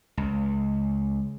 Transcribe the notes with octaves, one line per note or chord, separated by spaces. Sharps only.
C#2